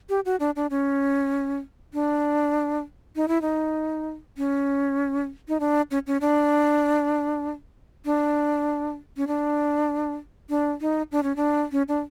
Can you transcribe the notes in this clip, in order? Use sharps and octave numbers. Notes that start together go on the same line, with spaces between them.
G4
F#4
D4
D4
C#4
D4
D#4
E4
D#4
C#4
D#4
D4
C#4
C#4
D4
D4
C#4
D4
D4
D#4
D4
C#4
D4
C#4
D4